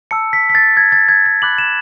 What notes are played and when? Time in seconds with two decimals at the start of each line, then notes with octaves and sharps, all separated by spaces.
0.11 A5 E6 C#7
0.33 B6
0.50 B6
0.55 A6
0.77 G#6
0.92 A6
1.09 G#6
1.26 A6
1.42 B5 D6 F#6 F#7
1.58 E7